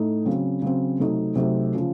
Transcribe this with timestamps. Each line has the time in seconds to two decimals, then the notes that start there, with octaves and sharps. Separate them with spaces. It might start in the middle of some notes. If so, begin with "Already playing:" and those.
Already playing: A2 A3 D#4 A4
0.25 C#3 F#3 C4
0.62 C#3 F#3 C4
0.99 C3 F#3 A3 D#4
1.35 C3 F#3 A3 D#4
1.74 C#3 F3